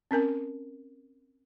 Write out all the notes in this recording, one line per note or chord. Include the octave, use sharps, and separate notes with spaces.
C4 C#4 A#4 G#5